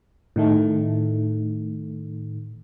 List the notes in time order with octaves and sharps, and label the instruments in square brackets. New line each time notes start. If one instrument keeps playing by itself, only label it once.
[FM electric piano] A2 D#3 A3